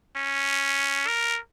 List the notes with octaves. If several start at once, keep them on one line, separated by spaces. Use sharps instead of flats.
C#4
A#4